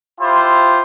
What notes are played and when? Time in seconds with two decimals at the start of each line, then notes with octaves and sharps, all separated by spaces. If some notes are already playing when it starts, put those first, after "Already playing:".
0.20 E4 F4 G4 C5